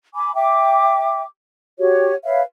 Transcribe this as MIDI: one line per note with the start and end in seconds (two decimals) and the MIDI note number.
0.14 0.31 80
0.14 0.31 83
0.14 0.31 86
0.35 1.23 76
0.35 1.23 79
0.35 1.23 86
1.79 2.13 66
1.79 2.13 67
1.79 2.13 73
2.24 2.41 71
2.24 2.41 73
2.24 2.41 76
2.24 2.41 77